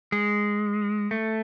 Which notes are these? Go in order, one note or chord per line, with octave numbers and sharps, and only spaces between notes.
G#3
A3